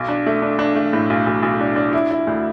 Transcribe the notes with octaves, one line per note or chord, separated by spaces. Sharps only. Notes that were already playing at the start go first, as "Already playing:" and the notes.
Already playing: B1
D4
A3
D4
D4
A3
A2
B1
B1
B1
D4
D4
E4
E4
D2